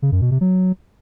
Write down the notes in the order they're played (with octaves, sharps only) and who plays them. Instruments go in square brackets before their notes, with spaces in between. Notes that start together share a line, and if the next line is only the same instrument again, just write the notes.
[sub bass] C#3
F#2
B2
C3
F#3